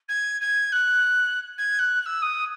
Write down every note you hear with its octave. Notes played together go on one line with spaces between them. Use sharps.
G#6
G#6
F#6
G#6
F#6
F#6
E6
D#6